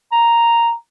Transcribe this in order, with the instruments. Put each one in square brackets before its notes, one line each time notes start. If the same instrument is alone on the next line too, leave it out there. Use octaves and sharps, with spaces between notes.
[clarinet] A#5